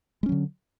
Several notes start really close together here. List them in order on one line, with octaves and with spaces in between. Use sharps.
G#3 C#4 F#3 D3